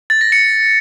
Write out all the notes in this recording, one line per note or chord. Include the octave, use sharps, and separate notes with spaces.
A6
A#6
C#7